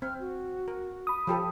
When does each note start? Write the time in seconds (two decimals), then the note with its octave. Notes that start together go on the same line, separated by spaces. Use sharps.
0.02 C4 F6
0.20 F#4
0.68 A#4
1.07 B5 D#6
1.27 F3 G4 A4